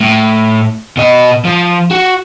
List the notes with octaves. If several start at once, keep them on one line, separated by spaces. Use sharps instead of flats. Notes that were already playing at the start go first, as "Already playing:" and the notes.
A2
B2 D#5
F3
F#4